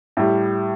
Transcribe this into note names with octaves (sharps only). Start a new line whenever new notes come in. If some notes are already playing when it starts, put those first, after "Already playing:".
A2 G3